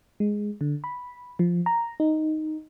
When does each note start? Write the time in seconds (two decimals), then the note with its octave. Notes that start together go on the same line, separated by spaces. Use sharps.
0.20 G#3
0.61 D3
0.84 B5
1.39 F3
1.66 A#5
2.00 D#4